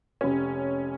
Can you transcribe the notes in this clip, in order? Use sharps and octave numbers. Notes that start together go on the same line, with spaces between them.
F1 C#4